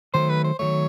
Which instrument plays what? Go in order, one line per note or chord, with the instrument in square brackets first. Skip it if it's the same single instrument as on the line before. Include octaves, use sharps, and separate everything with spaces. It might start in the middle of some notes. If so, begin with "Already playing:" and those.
[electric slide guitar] D#3 F#3 A3 [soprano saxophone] C5
[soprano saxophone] B4
C5
[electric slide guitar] D#3 F#3 A3 [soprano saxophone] C#5